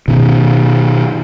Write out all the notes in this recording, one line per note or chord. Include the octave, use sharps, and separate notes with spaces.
B2 D#3